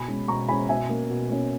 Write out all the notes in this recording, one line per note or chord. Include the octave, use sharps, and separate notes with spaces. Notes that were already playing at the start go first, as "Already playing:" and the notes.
Already playing: B2 G#5 B5
G#3 C#4
B2 A#5 C#6
G#3 C#4 G#5 B5
B2 E5 G#5
A#3 C#4
B2
A#3 C#4